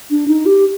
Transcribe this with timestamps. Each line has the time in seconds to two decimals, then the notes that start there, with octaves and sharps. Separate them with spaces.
0.10 D4
0.28 D#4
0.46 G4